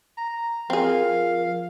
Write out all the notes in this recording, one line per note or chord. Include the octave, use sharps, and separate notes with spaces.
A#5
F3 C4 G#4 A#4 F5